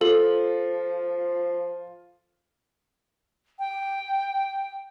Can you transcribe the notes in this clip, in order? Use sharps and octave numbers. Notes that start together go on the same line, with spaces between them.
F3 F4 A4 F#7
G5